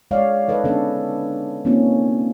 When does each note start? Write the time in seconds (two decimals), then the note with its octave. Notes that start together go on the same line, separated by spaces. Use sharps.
0.11 G#3 C#5 D5 F5
0.48 D#4 A4 B4 D#5
0.64 D3 B3 C#4 D4 A4
1.65 A#3 C4 C#4 D#4 F4